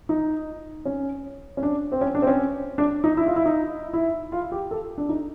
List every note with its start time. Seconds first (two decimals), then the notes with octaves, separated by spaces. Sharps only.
0.09 D#4
0.85 C#4
1.57 C#4
1.63 D4
1.92 C4
2.01 C#4
2.15 D4
2.22 C4
2.27 C#4
2.78 D4
3.04 D#4
3.17 E4
3.26 F4
3.36 E4
3.46 D#4
3.93 E4
4.32 F4
4.52 G4
4.71 A4
4.98 D4
5.09 D#4